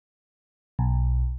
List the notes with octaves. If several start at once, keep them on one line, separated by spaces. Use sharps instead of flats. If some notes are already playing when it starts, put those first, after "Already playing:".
B1